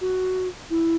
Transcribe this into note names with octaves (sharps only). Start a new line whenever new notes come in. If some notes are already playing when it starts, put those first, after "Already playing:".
F#4
E4